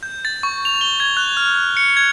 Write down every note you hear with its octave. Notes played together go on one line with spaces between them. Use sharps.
G6
A6
C#6
F7
G7
G#6
F#6
F6
C#7
G#6